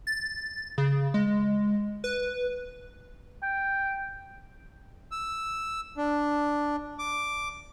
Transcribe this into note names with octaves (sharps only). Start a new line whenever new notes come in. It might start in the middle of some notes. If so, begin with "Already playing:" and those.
A6
C#3
G#3
B4
G5
E6
D4
D6